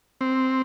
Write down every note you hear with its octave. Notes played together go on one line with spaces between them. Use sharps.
C4